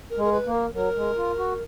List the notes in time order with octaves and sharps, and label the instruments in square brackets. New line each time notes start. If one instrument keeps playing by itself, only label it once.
[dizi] A#4
[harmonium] G#3
[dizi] A#4
B4
[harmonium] A#3
[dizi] A#4
[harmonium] F#3 [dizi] A#4
[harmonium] G#3
F4
F#4